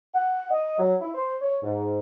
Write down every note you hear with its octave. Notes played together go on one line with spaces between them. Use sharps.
F#5
D#5
F#3
E4
C5
C#5
G#2